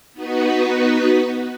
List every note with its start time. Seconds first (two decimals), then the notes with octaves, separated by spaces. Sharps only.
0.13 B3 D#4 F#4 B4